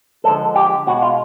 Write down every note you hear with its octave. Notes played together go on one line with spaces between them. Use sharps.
D3 F3 G#3 A4
G4
B2 G#3 F#4
F4